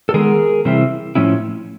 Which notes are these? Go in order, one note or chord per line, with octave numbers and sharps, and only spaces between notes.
A4
D#3 G#3 B3 G#4 A#4
C3 E3 G3 C4 E4
A2 F3 A3 C#4 E4